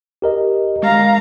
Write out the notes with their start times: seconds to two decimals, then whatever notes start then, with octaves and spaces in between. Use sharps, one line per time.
0.22 G4 A#4 D#5
0.83 G#3 F5 A#5